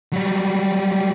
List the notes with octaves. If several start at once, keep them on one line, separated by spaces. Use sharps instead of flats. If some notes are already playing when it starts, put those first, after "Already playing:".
F#3 G3